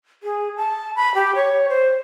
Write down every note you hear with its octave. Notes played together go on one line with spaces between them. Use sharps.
G#4
A5
B5
G4
C#5
C5